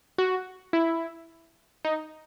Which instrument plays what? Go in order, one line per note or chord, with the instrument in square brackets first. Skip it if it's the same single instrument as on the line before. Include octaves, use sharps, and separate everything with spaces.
[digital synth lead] F#4
E4
D#4